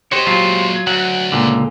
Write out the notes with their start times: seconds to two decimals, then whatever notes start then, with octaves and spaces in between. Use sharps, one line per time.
0.12 F#4 G4 C5 C#5 D#5
0.27 A#2 F#3 G#3 F4
0.87 D2 F#3 F#5
1.32 C#2 A#2 D3